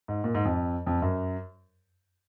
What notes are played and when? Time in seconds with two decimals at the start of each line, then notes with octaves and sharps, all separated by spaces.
0.08 G#2
0.24 A#2
0.35 G#2
0.45 F2
0.86 F2
1.02 F#2